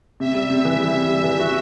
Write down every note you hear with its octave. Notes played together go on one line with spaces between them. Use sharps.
C3 E5
G3
C3
E3
G3 E5
C3
G3
E3
F#4